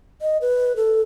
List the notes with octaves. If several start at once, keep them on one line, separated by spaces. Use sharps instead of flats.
D#5
B4
A4